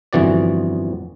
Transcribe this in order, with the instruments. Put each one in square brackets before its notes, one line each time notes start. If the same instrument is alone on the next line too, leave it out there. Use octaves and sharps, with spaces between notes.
[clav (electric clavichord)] G1 F2 E3 F#4 D5